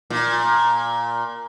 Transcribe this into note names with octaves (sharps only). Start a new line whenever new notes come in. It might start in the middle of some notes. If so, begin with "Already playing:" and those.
A#2